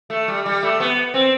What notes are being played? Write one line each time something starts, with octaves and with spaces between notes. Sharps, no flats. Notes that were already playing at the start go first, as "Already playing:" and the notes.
A3
G3
G3
A3
B3
C4